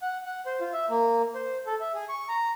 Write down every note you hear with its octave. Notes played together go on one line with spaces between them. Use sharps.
F#5
F#5
C5
F4
E5
A#3
C5
A4
E5
G#4
C#6
A#5